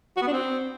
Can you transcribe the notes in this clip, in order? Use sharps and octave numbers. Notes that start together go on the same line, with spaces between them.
F#4
B3
D4
C4